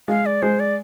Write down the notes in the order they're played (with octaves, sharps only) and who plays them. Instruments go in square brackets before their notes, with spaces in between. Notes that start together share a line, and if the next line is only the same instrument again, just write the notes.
[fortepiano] G#3 [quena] F5
[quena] D5
[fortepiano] G#3 [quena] C5
[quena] D5